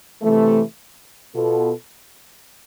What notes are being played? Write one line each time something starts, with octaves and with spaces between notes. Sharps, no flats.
C3 E3 A3
B2 B3 F4 A4